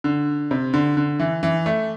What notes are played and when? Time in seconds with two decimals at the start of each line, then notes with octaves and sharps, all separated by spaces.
0.04 D3
0.51 C3
0.74 D3
0.97 D3
1.20 E3
1.43 E3
1.66 A3